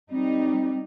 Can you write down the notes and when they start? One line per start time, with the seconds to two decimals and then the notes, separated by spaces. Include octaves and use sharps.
0.11 G3 C4 D#4